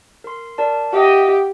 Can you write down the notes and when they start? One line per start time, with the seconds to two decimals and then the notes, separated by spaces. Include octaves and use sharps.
0.24 A#4 C6
0.58 A#4 D5 A5
0.94 G4 D#5 E5 F#5